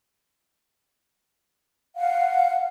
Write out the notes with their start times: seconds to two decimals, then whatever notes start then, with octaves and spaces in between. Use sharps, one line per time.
1.96 F5 F#5